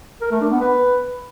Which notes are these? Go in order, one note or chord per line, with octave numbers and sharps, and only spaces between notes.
A#4
A3
D4
B3
B4